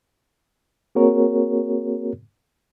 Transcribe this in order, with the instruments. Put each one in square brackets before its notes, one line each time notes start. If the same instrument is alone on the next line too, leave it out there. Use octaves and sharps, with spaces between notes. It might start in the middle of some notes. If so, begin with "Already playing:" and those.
[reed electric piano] A#3 C4 F#4 G#4 A#4 C#5